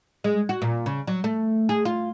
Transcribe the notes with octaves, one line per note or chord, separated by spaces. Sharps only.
G#3
F#4
A#2
C#3
F#3
A3
G#4
F4